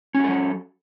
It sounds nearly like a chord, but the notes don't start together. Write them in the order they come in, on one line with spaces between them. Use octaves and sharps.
C#4 F#4 A4 F#3